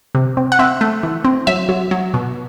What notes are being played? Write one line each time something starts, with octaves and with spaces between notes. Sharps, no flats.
C3
C4
F#5
C4 E5
A3
E3
C4
F#3 E5
F#3
F#3
B2